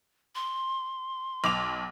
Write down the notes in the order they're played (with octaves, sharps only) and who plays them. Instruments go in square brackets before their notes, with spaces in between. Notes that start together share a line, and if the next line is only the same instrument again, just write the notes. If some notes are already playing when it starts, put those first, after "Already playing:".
[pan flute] C6
[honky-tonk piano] B1 D6 F7